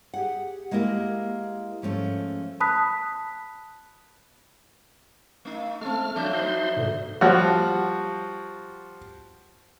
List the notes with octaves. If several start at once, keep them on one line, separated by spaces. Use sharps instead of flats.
G4 G#4 F#5
G#3 A#3 E4 G4 A#4
G#2 F3 A3 C#4
A5 B5 D#6 F#6 B6
A3 D#4
A3 C4 A4 F6
F3 F#3 D4 E5 G6
D#4 C5 C6
G#2 B2 D3
F3 G3 F#4